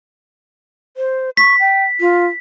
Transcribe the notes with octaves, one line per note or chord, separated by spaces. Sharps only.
C5
C#6 B6
G5
F4